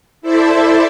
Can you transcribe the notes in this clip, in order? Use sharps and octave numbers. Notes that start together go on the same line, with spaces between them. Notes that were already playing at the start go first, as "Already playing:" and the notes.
E4 A4 C5 D5 E5